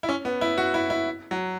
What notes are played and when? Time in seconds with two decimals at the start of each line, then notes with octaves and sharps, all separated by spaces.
0.03 E4
0.09 C#4
0.25 B3
0.41 E4
0.58 F#4
0.74 E4
0.90 E4
1.31 F#3